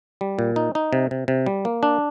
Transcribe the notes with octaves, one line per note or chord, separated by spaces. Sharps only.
G3
A#2
D#4
D#4
C3
C3
C3
G3
A#3
D4